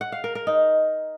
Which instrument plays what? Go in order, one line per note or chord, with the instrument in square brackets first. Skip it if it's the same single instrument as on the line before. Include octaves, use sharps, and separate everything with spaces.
[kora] F#5
F5
A#4
A#4
D#4